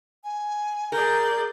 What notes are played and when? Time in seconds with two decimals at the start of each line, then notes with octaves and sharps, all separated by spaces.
0.24 G#5
0.92 G#4 A#4 D5 G6